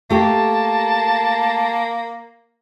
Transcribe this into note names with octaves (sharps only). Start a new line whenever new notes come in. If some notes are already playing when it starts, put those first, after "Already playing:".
A3 A#3 G4 A5